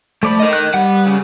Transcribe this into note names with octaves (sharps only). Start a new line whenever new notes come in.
F3 A3 D5 B5
A#4 D#5
F#6
G3 B4 F#5
C#3